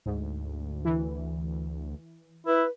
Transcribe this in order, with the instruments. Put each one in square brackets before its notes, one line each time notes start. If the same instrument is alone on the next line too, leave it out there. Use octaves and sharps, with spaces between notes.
[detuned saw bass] D2 [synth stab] G#2
[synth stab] E3
[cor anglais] E4 [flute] B4